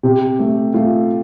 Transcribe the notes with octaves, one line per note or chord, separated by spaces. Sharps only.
C3 G4
A3
A3 F4